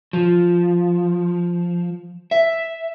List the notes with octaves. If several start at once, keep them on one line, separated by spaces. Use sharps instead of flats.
F3
E5